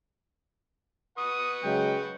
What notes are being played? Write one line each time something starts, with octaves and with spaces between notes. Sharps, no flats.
B4 F#5 C#6 D#6
C#3 F#3 G#3 G5